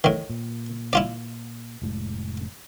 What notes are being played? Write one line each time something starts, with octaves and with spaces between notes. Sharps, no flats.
A2 D#3
A#2
E4 F4 D5
F1 A2 G#3